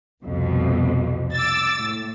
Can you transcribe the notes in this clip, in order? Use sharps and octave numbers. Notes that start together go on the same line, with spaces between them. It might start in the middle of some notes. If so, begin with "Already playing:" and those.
C2 F2 B2
D6 E6 A6
A2